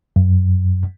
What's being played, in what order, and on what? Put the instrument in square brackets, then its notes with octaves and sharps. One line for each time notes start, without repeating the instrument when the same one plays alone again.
[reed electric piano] F#2